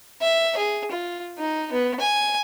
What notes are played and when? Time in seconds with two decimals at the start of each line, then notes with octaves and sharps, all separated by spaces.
0.22 E5
0.57 G#4
0.91 F4
1.38 D#4
1.72 B3
2.00 G#5